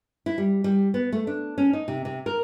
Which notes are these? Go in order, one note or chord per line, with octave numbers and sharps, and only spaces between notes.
E4
G3
G3
B3
A3
D4
C#4
D#4
C3
C3
A#4